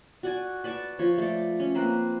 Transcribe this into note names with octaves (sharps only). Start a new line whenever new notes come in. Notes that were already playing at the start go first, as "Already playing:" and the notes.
F#4 D5 G#5
B4 D5 A5 C#6
F3 C#5
A3 D5
C#4
A#3 C4 A#4 B4